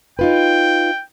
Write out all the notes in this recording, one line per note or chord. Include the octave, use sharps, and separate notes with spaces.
D#4 F4 B4 G5